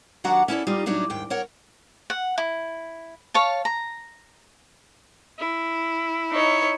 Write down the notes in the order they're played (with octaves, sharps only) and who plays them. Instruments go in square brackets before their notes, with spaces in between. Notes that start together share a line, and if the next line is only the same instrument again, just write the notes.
[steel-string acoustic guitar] D#2 F#3 D4 F#4 F#5 A#5
C#4 E4 A4 D5
G3 D#4 F4
A2 F#3 D4 D#4
D#2 G#2 G5
A#4 C#5 F#5
[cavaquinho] F#5
E4
C#5 F5 A5
A#5
[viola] E4
[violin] D#4 C#5